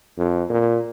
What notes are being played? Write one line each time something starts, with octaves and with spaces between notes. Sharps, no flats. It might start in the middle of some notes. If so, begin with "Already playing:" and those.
F2
A#2